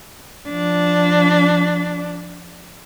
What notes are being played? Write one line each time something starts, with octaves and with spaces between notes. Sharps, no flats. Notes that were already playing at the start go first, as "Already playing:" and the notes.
F3 D4